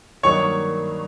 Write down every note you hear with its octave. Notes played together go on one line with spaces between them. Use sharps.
G2 D#3 F#3 A#3 D#4 C#5 C#6